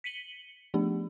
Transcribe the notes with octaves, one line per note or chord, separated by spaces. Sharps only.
B6 C#7 D#7 F#7 G7
F3 A3 B3 D4 G4